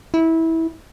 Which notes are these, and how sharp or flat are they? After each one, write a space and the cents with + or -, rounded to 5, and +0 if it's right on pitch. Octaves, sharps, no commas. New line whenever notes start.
E4 -20